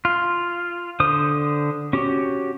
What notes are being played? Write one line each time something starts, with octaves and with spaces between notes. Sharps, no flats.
F4
D3 C5 D#6
C#4 F#4 G4